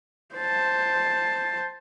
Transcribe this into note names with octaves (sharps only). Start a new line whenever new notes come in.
C5 A5